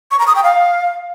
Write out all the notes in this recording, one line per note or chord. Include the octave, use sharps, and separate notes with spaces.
C#6
A#5
D#6
G5
F5